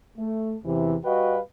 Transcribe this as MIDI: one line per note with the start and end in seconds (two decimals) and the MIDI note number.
0.18 0.56 57
0.65 0.97 40
0.65 0.97 48
0.65 0.97 52
1.05 1.39 55
1.05 1.39 66
1.05 1.39 71
1.05 1.39 75
1.05 1.39 77
1.05 1.39 79